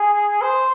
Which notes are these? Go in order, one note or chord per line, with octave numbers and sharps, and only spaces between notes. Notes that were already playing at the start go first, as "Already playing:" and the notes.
Already playing: G#4
C5